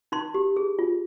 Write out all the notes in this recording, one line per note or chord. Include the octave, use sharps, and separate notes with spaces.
D#4 C6
G4
G#4
F4